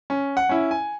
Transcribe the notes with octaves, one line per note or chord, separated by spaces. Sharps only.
C#4
F#5
C#4 E4
G#5